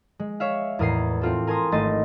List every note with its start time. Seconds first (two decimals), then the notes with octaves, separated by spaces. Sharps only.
0.19 G#3
0.40 C#5 E5 F5
0.79 E2 A2 A#4 D#6 G#6 C7
1.22 C4 F4 A4
1.47 A#4 G#5 A5 C6 D#6
1.72 G#1 A3 D#5 C6 A6 D#7